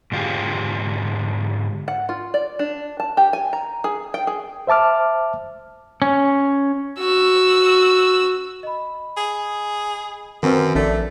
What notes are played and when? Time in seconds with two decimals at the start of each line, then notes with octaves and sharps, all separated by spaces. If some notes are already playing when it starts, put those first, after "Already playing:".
0.12 G#2 D3 F4 G4 G#4
1.88 F#5
2.09 F4
2.34 D5
2.59 D4
3.00 A5
3.17 G4
3.33 G#5
3.53 A#5
3.84 G#4
4.14 G5
4.27 G#4
4.67 C5 E5 A5 D6 F6
6.02 C#4
6.99 F#4 E6
8.63 D#5 B5
9.17 G#4
10.43 F#2 D#3 C4 A#4 B4
10.75 A#1 A3 D4 A4 D5